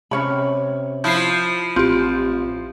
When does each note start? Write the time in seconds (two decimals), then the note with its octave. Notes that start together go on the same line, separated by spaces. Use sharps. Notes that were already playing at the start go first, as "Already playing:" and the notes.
0.11 C3 C#4 C#5 B5
1.04 F3 E4 G6 C7
1.76 A1 C4 F4 G4